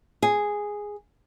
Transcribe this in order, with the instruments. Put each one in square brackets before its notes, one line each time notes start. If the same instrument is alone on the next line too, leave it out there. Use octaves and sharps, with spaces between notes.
[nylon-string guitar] G#4